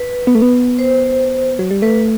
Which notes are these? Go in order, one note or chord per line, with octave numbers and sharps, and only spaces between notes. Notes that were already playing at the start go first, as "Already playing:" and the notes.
Already playing: B4
B3
A3
B3
C5
F#3
G3
A3 B4